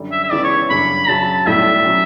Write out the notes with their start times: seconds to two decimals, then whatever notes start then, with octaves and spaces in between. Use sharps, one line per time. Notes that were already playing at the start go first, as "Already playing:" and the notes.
Already playing: F#2 D3 G3
0.12 E5
0.24 E5
0.31 C#2 C#3 E3 B3 D5
0.43 C#5
0.70 G1 F#2 C#3 G3 D4 B5
1.08 F#2 C#3 F#3 A5
1.47 B1 A2 G3 E5
1.86 F#3 C#4